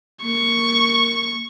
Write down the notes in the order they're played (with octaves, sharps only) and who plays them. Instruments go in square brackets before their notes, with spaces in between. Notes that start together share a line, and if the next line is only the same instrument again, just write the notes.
[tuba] A#3 [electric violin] C#6